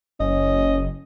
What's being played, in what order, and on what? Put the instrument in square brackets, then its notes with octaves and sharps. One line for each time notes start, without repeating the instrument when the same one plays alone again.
[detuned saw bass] F#1 [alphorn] C#4 [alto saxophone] D#5